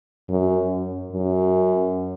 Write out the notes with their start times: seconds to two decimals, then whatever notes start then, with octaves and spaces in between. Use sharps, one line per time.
0.29 F#2
1.13 F#2